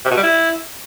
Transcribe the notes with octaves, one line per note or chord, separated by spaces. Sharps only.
C3
B2
G3
E4